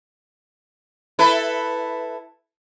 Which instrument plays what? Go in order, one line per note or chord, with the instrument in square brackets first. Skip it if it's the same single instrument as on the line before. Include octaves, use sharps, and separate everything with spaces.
[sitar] E4 A4 B4